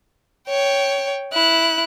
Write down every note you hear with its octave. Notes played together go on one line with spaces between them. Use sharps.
C#5 G5
E4 F#6